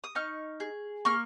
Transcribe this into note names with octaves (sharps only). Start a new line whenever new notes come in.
D#6
D#4 C#6 F6
G#4
A#3 C#6 F6